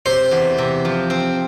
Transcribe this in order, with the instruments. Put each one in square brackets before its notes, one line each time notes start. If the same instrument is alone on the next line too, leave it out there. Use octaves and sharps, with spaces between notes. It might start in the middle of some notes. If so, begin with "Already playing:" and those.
[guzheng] C3 [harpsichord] C5
[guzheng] E2
C3
F3
C4